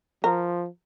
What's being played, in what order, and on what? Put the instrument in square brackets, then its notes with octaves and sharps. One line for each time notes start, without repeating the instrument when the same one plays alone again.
[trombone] F3 [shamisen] A#4